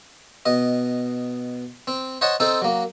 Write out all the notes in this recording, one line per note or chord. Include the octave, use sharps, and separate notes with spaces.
B2 D#5
C4
C5 C#5 D#5 F#5 A5
C4 D#4 A4 C5
F#3 A#3